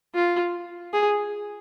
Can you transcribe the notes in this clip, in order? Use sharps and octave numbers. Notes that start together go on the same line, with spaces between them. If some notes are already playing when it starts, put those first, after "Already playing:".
F4
G#4